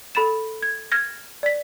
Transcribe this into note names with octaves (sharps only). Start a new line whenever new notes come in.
A4 B5 A6 E7
G#6
F6 G#6 A#6
D5 B6